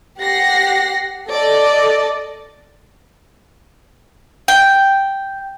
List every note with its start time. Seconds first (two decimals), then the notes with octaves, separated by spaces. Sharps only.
0.20 G4 F#5 A#6 C7
1.30 A4 D5 D#5
4.48 G5